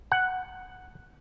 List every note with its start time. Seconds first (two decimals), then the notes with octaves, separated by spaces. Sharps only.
0.12 F#5